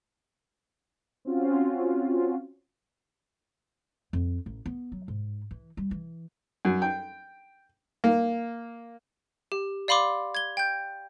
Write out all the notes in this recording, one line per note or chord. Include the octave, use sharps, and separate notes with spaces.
C4 C#4 F4 F#4
F2
A1
B3
F#3
G#2
E3
G3
E3
F#2
G5
A#3
G4
D5 F5 B5 C6 D6
G#6 G7
G5 G6